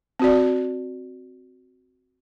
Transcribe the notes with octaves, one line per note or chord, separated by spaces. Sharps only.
C4 F#4 D5